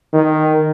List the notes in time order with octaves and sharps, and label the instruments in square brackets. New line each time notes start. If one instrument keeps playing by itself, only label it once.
[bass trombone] D#3